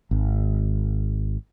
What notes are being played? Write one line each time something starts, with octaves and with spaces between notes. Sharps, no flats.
G#1